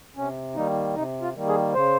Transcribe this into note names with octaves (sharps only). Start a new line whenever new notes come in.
C3 C#4
D#3 G3 A#3 D#4
C3 D#4
F4
D#3 G3 A#3
G#4
C#3 C5